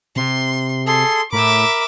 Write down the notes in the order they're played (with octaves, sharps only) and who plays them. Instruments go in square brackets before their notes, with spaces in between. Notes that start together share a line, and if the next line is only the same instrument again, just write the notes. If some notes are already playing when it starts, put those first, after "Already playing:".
[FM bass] C3 [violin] C6
[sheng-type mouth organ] G#4 A4 [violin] C6
[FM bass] A2 [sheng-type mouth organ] A#4 B5 [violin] E5 D6